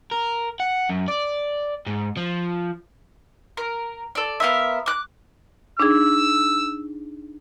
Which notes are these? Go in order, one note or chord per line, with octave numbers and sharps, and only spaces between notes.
A#4
F#5
F#2
D5
G#2
F3
A#4
A4 D5
B3 F4 A#4 E5
D6 F#6
D4 D#4 G#4 E6